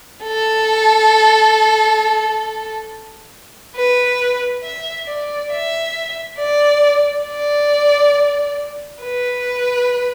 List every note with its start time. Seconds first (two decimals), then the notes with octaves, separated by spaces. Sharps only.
0.24 A4
3.76 B4
4.63 E5
5.07 D5
5.52 E5
6.38 D5
7.27 D5
9.03 B4